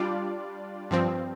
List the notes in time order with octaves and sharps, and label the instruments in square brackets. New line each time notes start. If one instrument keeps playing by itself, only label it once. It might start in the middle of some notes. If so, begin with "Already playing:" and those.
Already playing: [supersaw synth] G3 D4 F4 D5
G2 F3 C4